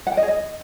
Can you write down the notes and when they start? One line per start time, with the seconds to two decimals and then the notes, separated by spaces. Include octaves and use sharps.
0.07 F#5
0.12 G5
0.17 D#5
0.23 G#4
0.28 D#5